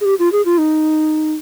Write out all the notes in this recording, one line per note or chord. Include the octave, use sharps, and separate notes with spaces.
G#4
G4
F4
G#4
F4
D#4